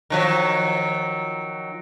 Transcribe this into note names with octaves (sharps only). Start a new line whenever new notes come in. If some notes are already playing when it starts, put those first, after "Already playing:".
D#3 F3 F#3